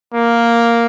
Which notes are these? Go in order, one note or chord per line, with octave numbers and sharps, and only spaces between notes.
A#3